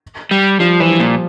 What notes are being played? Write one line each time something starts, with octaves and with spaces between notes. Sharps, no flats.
G3
F3 G3
E3 F3
G3
A#2